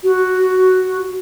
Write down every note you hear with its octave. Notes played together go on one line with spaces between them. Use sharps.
F#4